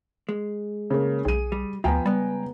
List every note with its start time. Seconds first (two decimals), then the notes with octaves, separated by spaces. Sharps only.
0.29 G#3
0.90 C#3 A#3
1.25 B1 G#4 D#7
1.52 G3
1.84 D2 F3 B3 G5 G#5 A#5
2.06 C#2 G3 B3